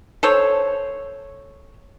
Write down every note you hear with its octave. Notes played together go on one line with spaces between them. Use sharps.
A4 C5 C#5